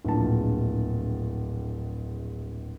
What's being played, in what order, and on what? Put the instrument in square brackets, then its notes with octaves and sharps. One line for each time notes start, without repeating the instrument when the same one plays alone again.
[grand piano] D1 A#1 A5